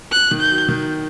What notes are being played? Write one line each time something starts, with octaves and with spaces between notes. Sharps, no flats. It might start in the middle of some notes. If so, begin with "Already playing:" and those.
F#6
D#3
G6
F#3
D#3